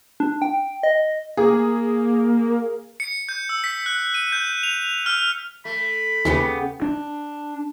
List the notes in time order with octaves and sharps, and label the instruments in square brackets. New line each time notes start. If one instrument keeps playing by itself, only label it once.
[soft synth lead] D4
G5
D#5
[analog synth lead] A#3 [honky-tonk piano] G#4
[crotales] C#7
G6
E6
B6
F#6
D#7
G6
F7
F6
[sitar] A3 [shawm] B5
[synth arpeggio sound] D#2 [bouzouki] C#3 B3 G4
[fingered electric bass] D4